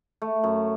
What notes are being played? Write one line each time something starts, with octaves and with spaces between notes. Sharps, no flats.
A3
F#2